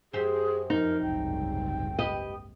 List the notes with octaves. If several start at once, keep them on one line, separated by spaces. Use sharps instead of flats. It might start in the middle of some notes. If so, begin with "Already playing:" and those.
F#2 G4 G#4 C5
F2 D#4 A#4
F#1 C2 G#2 G5
G4 B4 D#5